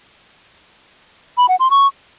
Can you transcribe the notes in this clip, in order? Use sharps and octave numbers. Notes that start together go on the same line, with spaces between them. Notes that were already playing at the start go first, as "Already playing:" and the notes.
B5
F#5
C6
C#6